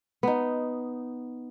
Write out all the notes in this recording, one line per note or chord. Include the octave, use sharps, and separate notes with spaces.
B3 D#4